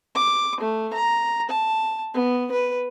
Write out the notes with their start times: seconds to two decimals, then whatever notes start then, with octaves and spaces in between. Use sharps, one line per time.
0.15 D6
0.60 A3
0.93 A#5
1.49 A5
2.14 B3
2.51 B4